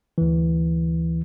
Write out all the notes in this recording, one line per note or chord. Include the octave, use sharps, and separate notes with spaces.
D2 E3